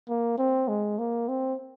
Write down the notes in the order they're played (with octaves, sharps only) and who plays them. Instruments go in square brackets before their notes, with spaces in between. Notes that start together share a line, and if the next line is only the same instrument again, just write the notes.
[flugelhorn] A#3
C4
G#3
A#3
C4